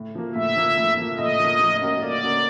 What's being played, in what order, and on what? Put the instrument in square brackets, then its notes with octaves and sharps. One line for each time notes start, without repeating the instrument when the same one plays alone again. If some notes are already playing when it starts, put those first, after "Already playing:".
Already playing: [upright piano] A2
F3 A#3
[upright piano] A2 [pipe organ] E5
[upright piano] F3 A#3
A2
F3 A#3
[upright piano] A2 [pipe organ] D#5
[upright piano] F3 A#3
A#3
C#4 F#4 A#4
[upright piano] A#3 [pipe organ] D5
[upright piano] C#4 F#4 A#4